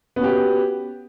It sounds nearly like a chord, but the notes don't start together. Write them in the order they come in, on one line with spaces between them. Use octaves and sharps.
B3 C#4 F#4 G4